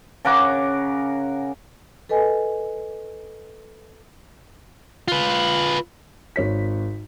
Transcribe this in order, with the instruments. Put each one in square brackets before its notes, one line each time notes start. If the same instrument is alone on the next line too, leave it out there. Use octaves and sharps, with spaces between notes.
[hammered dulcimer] C#3 A#4 F#5 D6
[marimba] A4 B4 D#5 G#5
[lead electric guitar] F4 B4
[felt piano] G#1 C#5 B6